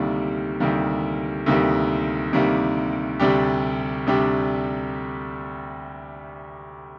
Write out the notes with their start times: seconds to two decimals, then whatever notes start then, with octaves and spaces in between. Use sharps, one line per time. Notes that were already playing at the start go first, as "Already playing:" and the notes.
Already playing: D2 C3 D#3 G3 A#3
0.60 D2 C3 D#3 G3 A#3
1.46 D2 C3 D#3 G3 A#3
2.33 D2 C3 D#3 G3 A#3
3.19 D2 C3 G3 D4 G4
4.06 D2 C3 G3 D4 G4